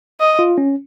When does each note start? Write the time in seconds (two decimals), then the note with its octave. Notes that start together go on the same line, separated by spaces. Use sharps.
0.20 D#5
0.39 F4
0.58 C#4